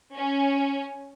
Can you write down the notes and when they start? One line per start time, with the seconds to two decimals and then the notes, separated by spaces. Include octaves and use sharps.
0.15 C#4